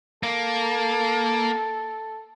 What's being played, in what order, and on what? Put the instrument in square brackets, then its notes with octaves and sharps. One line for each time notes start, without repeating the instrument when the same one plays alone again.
[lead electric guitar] A#3 [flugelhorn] A4